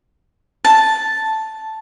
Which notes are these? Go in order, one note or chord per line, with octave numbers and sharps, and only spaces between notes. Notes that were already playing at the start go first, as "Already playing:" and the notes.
A5